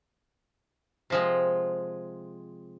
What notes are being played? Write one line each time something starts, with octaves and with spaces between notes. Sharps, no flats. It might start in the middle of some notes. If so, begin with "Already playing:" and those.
C3 F3 G#3